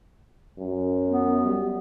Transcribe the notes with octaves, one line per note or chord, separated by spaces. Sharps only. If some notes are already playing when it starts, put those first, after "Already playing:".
F#2
B3
G3